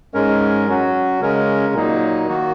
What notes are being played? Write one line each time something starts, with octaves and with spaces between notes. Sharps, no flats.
G#2 G#3 C#4 A#4
F#3 C#4 F#4
C#3 G#3 C#4 A#4
A#2 F#3 A#3 D#4
D#3 A#3 F#4